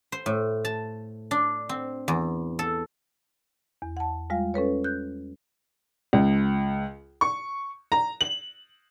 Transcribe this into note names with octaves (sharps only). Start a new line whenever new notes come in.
C5
A2
A5
D4
C4
E2
A4
E2
F#5 A5
G3 G#3 F4 F5
C#4 A4 B4 C#5
F#6 G6
C#2
C#6
A#5
F#7